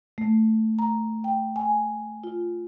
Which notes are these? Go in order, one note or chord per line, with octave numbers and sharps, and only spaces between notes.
A3
A#5
G5
G#5
F4